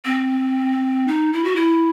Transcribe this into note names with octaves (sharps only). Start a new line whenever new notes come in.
C4
D#4
E4
F#4
E4